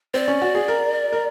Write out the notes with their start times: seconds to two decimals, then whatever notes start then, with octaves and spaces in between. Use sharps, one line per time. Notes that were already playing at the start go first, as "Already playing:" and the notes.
0.14 C4 D5
0.28 C#4
0.42 F#4
0.55 G#4
0.68 A#4
1.12 A#4